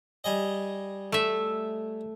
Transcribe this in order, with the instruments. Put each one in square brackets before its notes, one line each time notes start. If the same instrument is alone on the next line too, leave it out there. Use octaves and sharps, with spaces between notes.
[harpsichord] G3 G#4 D#5
[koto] A3 E5